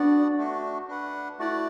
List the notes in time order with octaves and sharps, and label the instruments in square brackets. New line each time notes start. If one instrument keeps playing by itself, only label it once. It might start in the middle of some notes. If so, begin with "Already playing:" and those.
Already playing: [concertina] B3 F#4 D5 F#5 [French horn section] D4
[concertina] A3 D4 F#4
D4 B4 F#5
[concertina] A3 F#4 D5 F#5 [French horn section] E4